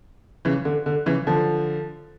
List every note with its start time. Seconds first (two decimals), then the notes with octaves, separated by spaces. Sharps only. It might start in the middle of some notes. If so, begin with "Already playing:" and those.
0.45 C#3 E3
0.65 D3
0.86 D3
1.06 C#3 E3
1.27 D3 F3